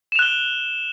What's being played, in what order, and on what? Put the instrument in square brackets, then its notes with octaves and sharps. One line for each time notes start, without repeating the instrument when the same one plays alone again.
[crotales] E7
F7
F#6
G7